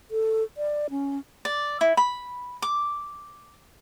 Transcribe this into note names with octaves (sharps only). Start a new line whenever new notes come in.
A4
D5
C#4
D5
E4
B5
D6